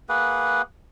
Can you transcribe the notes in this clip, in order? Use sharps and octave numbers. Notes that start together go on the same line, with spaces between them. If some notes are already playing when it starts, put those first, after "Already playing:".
A#3 G#4 B4 F#5